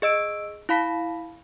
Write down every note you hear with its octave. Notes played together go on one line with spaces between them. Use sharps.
G#4 D#5 E6 D7
E4 F5 B5 B6